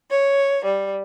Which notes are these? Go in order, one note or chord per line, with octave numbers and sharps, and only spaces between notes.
C#5
G3